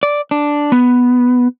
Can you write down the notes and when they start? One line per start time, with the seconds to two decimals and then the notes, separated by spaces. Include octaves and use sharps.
0.03 D5
0.31 D4
0.72 B3